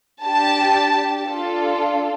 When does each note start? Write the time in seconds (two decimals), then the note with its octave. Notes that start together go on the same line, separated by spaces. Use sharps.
0.23 D4 G4 A5
1.26 D4 F4 A4